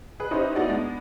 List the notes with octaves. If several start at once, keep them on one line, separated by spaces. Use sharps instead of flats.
G#4 B4
C#4 D#4 E4 G4 B4 C5
B3 D#4 E4 F#4 G#4 D5
G#3 B3 D4